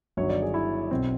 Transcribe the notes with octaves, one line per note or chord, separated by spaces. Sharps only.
G1 G2 D#3 F#3 C#5
D5
G#4
E4
B1 B2 F#3 C4